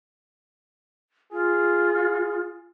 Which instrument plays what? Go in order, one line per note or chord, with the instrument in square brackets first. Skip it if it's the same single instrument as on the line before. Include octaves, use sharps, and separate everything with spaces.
[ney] F4 [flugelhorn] G#4